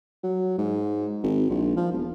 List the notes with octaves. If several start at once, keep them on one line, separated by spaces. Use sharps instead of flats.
F#3
G#2
G#1
A#1
F3
E1